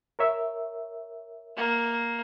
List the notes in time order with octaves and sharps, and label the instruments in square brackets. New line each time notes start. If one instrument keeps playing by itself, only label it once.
[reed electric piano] A#4 C#5 E5
[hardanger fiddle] A#3